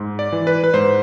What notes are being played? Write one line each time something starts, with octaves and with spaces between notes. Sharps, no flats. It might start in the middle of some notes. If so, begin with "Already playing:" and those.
Already playing: G#2
D5
E3
B4
B4
G#2 C5